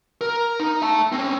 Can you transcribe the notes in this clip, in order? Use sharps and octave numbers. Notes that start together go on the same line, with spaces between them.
A#4
D#4
E5 A5
C4 C#4